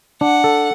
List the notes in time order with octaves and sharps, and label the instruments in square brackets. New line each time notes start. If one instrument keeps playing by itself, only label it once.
[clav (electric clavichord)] D4 [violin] F#5
[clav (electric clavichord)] A4